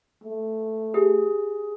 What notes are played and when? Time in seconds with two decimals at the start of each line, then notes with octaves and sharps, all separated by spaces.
0.24 A3
0.94 G4 G#4